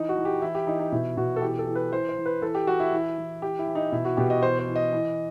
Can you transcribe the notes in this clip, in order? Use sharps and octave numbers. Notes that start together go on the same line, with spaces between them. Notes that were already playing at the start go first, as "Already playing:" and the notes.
Already playing: E3 D#4
F#4
E3
G4
E3 E4
G4
E3 D#4
D#4
B2 E4
B2 F#4
A4
E3 G4
A4
E3
B4
E3 C5
C5
E3
B4
E3 A4
G4
E3 F#4
E4
E3
E3
E3 G4
E4
E3
D#4
B2 E4
F#4
B2 G4
D#5
E3 C5
C5
E3
D#5
E3